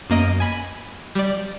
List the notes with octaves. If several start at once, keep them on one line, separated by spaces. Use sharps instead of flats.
F#2 A#3 D#5 D7 D#7
G#5 B5
G3 D5